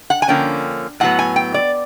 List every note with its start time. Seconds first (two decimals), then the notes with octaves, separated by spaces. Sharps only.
0.10 F#5
0.22 G#5
0.28 D3 F3 A#3 C#4 G5
1.00 A2 F#3 B3 F#5
1.19 G#5
1.36 G5
1.54 D5